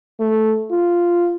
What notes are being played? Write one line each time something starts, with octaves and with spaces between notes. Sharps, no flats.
A3
F4